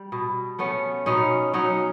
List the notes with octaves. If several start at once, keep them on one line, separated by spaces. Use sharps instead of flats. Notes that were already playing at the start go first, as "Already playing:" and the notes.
Already playing: G3
B2
A3 B3 C#4
B2 C#4 D#4
F#3 C#4 D#4